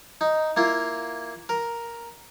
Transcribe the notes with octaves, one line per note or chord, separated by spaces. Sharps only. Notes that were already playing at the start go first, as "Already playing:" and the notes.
D#4
A#3 E4 F4
A#4